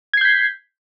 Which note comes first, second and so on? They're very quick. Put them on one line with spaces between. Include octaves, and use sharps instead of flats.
G#6 C7 G6 B6